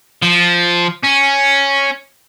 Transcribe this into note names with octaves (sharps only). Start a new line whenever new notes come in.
F3
C#4